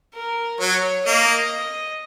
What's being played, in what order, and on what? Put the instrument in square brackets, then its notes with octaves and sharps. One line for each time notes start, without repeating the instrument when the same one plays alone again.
[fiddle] A#4
[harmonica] F#3 [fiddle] C#5
[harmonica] A#3 [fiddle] D#5